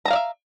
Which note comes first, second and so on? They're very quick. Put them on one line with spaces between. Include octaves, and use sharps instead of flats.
A#5 A5 F5 D5 E5